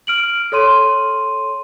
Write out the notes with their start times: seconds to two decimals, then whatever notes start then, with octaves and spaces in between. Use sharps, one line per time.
0.07 F6 D7 F#7
0.52 A4 C#5 C6 D#7